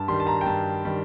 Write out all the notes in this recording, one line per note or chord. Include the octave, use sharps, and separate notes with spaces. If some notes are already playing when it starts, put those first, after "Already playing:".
Already playing: G2 A5
D#3 G3 C6
A5
A#5
G5
G2 A5
D#3 G3